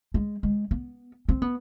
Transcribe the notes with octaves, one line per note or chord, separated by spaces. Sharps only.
G#3
G#3
B3
C4
B3